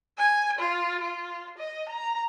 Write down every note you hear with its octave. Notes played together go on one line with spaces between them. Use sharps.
G#5
F4
F4
D#5
A#5